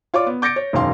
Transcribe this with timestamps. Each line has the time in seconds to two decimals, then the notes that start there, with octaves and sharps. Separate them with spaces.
0.14 F4 C#5 D5 D6
0.27 B3
0.42 D6 G6 A6 A#6 C#7 D7
0.56 C#5
0.73 E1 F#2 D#3 F5 C6